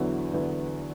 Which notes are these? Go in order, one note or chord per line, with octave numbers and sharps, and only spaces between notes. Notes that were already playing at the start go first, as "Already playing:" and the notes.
Already playing: E2 D3 F#3 B3 E4
E2 D3 F#3 B3 E4